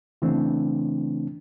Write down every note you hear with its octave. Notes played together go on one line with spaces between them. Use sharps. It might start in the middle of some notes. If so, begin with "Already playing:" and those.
C#3 E3 A3 C4 D4